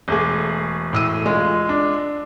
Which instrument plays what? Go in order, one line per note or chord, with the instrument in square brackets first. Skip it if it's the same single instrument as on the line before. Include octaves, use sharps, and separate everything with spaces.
[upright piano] E1 A3 G#4
[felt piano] A2 E6 D#7
G#3 F4
[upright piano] D4